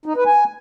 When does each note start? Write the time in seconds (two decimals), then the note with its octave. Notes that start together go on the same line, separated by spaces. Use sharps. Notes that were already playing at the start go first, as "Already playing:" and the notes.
0.06 D#4
0.16 B4
0.26 G#5